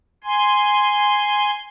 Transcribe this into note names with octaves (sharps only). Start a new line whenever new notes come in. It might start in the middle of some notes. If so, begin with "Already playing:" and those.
G#5 C6